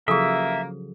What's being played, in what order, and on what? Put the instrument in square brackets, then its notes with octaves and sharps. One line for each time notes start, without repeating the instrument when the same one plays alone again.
[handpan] C#3 F3 F#3 [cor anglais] A#3 [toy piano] G#4 A4 [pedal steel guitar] E5